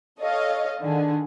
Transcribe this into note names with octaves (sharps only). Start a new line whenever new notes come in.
A4 C#5 D#5 F5
D3 D#3 G#4